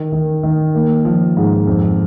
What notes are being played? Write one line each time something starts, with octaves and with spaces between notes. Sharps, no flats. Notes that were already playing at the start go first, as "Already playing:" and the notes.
Already playing: D#3
D#3
D#3
A#3
F3
G#2
F2